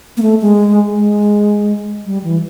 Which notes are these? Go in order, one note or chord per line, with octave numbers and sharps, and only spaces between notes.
A#3
A3
G#3
G#3
G3
E3